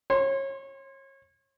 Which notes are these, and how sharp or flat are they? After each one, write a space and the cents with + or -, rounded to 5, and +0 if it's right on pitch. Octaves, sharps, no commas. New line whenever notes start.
C#5 -30 C6 +0